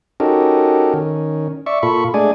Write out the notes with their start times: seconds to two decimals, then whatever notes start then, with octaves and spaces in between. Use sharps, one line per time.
0.20 C#4 D#4 F#4 G4 A4 A#4
0.94 D#3 C#4
1.66 D5 E5 C#6
1.83 A#2 F4 A4 B5 C#6
2.14 G#3 A3 D4 G#4 D5 G#5